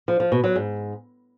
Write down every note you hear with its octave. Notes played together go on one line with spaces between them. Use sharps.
F3
F3
B2
F#3
G#2